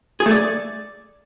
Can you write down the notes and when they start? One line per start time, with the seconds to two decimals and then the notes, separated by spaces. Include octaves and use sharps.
0.20 G#4
0.26 A3
0.31 D5